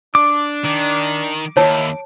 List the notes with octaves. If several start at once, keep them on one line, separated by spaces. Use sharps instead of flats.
D4 D6
D#3
D#2 A#3 D#4 E4 C#5 A5